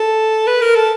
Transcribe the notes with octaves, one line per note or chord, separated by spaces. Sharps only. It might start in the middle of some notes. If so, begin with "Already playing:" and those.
Already playing: A4
B4
A#4
A4